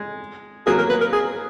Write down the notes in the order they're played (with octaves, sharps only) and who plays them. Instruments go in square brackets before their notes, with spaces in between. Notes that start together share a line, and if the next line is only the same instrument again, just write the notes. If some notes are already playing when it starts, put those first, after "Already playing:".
Already playing: [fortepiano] G#3
[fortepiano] F#3 A#3 [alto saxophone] G#4
[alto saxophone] A#4
B4
A#4
G#4